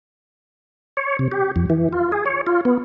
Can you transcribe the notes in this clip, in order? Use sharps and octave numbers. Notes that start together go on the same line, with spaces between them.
C#5
C3
G4
F2
E3
F4
G#4
C#5
F4
B3